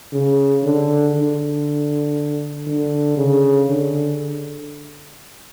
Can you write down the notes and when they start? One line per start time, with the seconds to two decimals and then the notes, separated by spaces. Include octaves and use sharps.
0.13 C#3
0.64 D3
1.15 D3
2.67 D3
3.17 C#3
3.68 D3